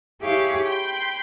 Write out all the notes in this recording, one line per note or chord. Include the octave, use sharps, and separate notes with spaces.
E4 G4 G#4 C#5 F5
G5 B5 C6 G6